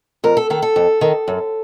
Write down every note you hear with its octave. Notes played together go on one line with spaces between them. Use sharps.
F2 A#4
A4
D#3 A4
A4
F2
D#3
F#2